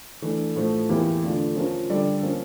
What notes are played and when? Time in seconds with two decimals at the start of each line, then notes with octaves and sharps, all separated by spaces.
0.22 E3 A3 D4
0.56 A2 F3 A3
0.89 E2 E3 A#3 E4 G4
1.22 D3 A3 D4 F4
1.56 F3 C#4 F4 A#4
1.89 D3 G3 D4 A4 D5
2.23 F3 A#3 C#4